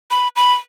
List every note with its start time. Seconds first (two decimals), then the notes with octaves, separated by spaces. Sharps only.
0.11 B5
0.36 B5